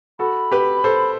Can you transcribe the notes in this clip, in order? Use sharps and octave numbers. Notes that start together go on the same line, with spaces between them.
F#4 A4 B5
G4 B4
A4 C5